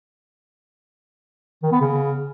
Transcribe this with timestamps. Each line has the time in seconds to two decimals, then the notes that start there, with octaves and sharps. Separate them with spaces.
1.63 D#3
1.72 B3
1.81 C#3